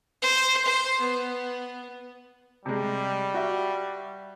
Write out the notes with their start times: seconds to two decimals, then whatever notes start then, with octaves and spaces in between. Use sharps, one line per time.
0.22 C5
0.65 C5
1.00 B3
2.66 C3 G3 G#3
3.34 F#4 E5